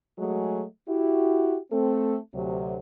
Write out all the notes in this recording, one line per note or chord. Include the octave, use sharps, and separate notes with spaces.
F#3 G#3 A3 F#4 G#4
E4 F#4 G4
A3 C4 A4
D2 C3 F#3